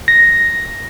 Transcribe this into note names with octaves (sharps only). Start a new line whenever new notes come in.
A#6